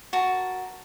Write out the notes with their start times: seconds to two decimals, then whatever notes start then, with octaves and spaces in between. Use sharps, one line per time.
0.13 F#4 A#4 A5